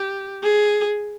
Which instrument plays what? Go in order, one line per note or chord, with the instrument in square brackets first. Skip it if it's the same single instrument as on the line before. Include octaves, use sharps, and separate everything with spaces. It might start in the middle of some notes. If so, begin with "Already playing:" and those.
Already playing: [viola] G4
G#4